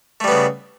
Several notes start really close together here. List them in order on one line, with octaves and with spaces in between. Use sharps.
A3 G3 B3 C#3